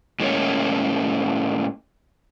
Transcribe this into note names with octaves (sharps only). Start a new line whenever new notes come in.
A2 D3 G#3 A#3 C#4 C#5